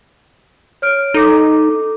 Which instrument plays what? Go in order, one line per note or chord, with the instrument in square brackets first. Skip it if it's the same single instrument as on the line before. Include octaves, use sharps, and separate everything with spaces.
[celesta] C#5 F6 D7
[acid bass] D#4 [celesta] A4 D6